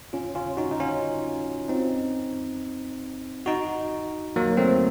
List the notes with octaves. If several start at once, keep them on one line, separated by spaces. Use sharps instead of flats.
C#4 F4
C#4 F4
D#4 F#4
D#4
C#4 F4
C4 D#4
D#4 F#4
F#3 A#3
A3 C4